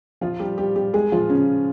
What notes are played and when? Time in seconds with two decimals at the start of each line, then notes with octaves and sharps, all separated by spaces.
0.21 F3 F4
0.40 G3 G4
0.58 G3 G4
0.76 G3 G4
0.93 G#3 G#4
1.12 F3 F4
1.30 C#3 C#4